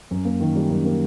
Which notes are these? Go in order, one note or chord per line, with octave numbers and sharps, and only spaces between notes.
F#2
A#3
D#3
G3
F#2
A#3